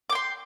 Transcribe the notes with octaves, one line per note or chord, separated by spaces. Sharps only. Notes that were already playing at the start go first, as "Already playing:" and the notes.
G5 C6 D6